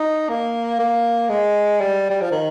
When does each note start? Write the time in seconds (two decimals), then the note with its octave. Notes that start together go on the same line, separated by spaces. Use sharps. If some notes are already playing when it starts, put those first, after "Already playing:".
Already playing: D#4
0.29 A#3
0.79 A#3
1.30 G#3
1.81 G3
2.11 G3
2.21 F3
2.32 D#3